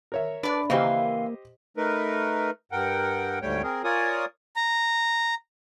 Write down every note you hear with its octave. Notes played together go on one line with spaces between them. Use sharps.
A#4 C#5 E5
D4 B4 D5
C#3 E3 A#3 C4 G4 C5 D#5 F5
A3 D#4 A#4 B4
G2 A#4 F#5 G5
D2 G#2 G3 A3 C#5 G5
C4 G#4 A#4
F4 A#4 C#5 D5 G#5 D#6
A#5